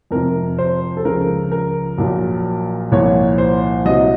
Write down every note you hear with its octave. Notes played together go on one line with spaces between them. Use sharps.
F2 C3 F3 A#4
C5
A4
C#2 C#3 F3 A#4
A#4
A#1 A#2 F#3
C2 A#2 F3 C#5
C5
C2 C3 F#3 D#5